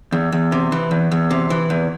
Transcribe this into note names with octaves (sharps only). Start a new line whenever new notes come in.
E2
E2
C3
E3
E2
E2
C3
E3
E2